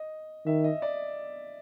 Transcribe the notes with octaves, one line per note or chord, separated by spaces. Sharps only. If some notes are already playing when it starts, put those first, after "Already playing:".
Already playing: D#5
D#3 E5
D#5
D5